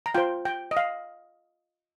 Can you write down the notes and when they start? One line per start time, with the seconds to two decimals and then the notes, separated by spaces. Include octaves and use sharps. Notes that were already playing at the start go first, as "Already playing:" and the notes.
0.06 A#5
0.15 F4 C5 G5
0.45 G5
0.71 D#5
0.77 F5